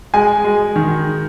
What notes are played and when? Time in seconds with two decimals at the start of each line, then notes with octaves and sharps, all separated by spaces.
0.14 G#3 G#5
0.44 G#3
0.76 D#3